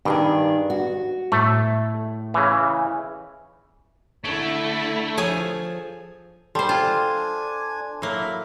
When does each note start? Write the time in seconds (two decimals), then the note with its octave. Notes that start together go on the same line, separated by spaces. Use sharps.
0.05 G2 D#3 D4 G#4
0.70 F#4
1.32 A2 A3
2.34 C#3 E3
4.24 D3 A3 E4 C#6 G#6 D7
5.17 F3 G#4 A4 C#5 G#5
6.55 G3 A4 C5 A5 C6
6.69 D4 F4 G#5
8.02 F#3 A#3 E4 B5